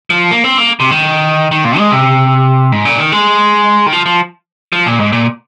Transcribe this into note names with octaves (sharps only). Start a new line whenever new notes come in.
F3
A#3
C4
A#3
C3
D#3
D#3
A#2
G#3
C3
G#2
A#2
D#3
G#3
D#3
F3
F3
F3
A#2
G#2
A#2